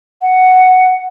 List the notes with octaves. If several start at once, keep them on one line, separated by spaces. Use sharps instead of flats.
F#5